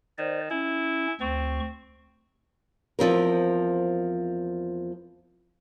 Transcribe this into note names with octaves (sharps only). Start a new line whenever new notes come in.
D#3 C5 D5
C#4 E4
D2 C4 C#6
E2 F3 C4 A#4